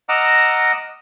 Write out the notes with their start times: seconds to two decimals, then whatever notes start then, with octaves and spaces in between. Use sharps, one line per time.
0.09 D#5 F#5 A#5 D6 E6 F6